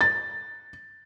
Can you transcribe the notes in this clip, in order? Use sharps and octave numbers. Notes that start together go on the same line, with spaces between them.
A6